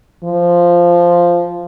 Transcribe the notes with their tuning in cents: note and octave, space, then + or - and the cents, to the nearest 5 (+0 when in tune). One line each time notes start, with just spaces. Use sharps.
F3 -5